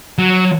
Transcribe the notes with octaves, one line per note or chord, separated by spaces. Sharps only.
F#3